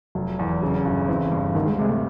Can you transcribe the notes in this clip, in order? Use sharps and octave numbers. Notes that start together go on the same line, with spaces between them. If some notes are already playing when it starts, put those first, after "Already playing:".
F1 F#3
E2
C#3 F#3
G1
E3 C4
G2
D2 D#3
G#3
C3 G#3
A3